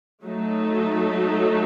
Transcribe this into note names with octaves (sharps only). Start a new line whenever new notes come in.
F#3 A3 D#4 A4